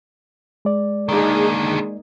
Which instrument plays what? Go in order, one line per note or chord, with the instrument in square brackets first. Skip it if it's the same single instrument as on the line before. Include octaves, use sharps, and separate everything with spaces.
[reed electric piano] G#3 D5
[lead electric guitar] D3 D#3 [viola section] A#3 D#4 G#4